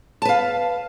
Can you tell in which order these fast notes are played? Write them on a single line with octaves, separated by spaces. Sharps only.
A5 B4 F5